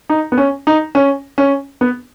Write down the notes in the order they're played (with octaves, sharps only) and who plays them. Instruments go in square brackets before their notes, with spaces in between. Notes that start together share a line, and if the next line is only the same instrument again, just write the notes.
[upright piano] D#4
B3
C#4
D#4
C#4
C#4
B3